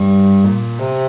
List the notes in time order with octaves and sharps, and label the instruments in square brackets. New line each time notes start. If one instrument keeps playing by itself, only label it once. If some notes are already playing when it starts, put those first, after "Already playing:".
Already playing: [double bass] G2
A#2
C3